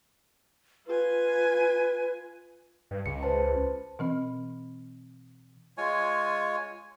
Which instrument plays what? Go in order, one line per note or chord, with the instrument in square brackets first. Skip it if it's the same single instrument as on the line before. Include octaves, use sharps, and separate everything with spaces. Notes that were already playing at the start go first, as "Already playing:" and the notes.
[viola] F4 G#5 [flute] B4
[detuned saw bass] G2
[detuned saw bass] C#2 [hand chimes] C#7
[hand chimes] B4 C5 A5
[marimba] B2 E3 C4
[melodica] G#3 F4 C#5 G#5